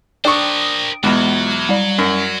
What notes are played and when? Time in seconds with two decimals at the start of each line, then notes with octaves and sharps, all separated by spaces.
0.25 D4 A#4 C5 G5 C#6 D#6
1.04 E2 B2 F#3 G#3
1.69 G3 D5
1.98 F#2